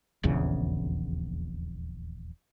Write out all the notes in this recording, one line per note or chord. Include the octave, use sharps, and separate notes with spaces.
D#1 A#1 E2 C#3